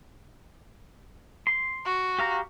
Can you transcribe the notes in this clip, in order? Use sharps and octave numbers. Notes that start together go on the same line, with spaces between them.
C6
F#4
G4 F5 A#5